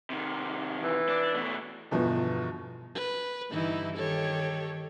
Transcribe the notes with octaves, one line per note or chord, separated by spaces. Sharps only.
C3 D#3
E3
D4
B2 A3
G1 E2 B2 F3
B4
G2 D3 E3 D#4 E4
D#3 G4 A4 C#5